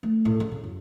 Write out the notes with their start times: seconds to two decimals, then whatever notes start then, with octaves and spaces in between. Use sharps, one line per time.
0.03 A3
0.25 A2
0.40 C#3
0.52 C#3
0.64 F#2